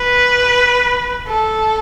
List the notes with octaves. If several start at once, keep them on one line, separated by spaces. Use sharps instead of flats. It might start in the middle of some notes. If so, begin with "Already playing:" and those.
Already playing: B4
A4